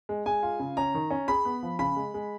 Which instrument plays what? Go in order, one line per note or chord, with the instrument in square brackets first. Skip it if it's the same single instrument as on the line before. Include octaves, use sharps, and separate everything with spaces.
[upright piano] G#3
[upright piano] G#3 [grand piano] G#5
[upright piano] F4
C#3
[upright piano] C#4 [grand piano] A#5
[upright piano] D#3
C#4
[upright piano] G#4 [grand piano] B5
[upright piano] B3
F3
[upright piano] C#3 [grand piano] B5
[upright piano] G#3
G#3